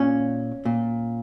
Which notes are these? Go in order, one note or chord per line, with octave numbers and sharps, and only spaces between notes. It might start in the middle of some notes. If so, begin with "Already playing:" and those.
Already playing: A#2 C#4
A#2